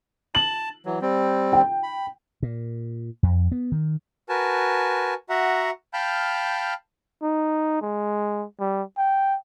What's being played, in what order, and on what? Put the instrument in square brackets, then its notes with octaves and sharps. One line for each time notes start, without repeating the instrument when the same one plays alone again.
[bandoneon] A5 [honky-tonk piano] F#7
[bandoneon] E3 F#3
G3 C4
[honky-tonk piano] G5
[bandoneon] B5
[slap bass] A#2
F2
B3
D#3
[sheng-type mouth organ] F#4 A#4 B4 G#5 A5
F#4 E5 F#5 A#5
F5 G5 A5 B5 F6 G6
[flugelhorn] D#4
G#3
G3
G5